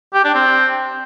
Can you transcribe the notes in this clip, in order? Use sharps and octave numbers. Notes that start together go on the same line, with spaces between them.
G4
D4
C4